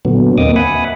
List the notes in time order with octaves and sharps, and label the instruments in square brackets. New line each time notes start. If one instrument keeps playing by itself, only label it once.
[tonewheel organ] A#2 D3 F#3 B3
D#2 A#3 C4 D#5 D6 D#6
E5 F#5 G#5 B5 D#6